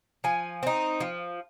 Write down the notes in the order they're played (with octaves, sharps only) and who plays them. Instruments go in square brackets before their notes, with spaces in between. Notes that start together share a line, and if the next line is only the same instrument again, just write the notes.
[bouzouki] F3 G#5
C4 D#4
F3